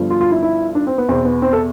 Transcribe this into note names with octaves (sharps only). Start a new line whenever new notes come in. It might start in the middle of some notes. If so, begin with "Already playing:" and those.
Already playing: G1 G2 F3
F4
F4
E4
E4
D4
C4
B3
E2 B2 C4
B3
C4
A4